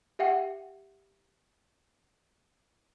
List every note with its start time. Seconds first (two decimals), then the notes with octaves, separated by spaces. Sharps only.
0.19 G4 E5 F#5 G5